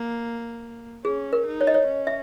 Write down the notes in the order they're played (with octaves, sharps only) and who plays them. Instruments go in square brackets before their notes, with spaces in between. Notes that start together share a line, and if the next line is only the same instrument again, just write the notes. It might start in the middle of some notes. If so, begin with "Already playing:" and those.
Already playing: [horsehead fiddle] A#3
[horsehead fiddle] C#4 [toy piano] G#4
[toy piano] A#4
[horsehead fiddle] D#4
[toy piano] C#5
D#5
C#5
[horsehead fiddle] C#4
[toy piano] E5